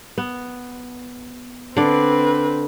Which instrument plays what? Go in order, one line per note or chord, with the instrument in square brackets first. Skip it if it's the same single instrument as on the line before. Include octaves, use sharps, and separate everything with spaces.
[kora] B3
[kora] D3 D5 [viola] C4 B4